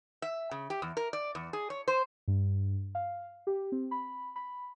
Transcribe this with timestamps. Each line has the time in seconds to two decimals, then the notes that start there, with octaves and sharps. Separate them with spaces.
0.22 E5
0.51 C#3
0.70 G4
0.82 E2
0.97 A#4
1.13 D5
1.35 E2
1.53 G#4
1.70 C#5
1.88 C5
2.28 G2
2.95 F5
3.47 G4
3.72 C4
3.91 B5
4.36 B5